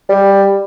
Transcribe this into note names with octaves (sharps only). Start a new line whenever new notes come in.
G3